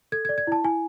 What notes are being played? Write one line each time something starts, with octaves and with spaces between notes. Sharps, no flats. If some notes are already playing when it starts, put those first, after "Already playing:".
A4 G#6
G#6
D5
G#6
E4 A5
E4 G#5